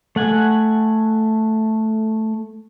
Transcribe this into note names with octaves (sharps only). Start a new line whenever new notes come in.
A3 F#5 G#5